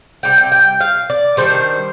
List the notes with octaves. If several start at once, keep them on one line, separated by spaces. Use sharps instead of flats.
C3 G3 G5
G5
G5
F5
D5
D#3 G3 D4 C5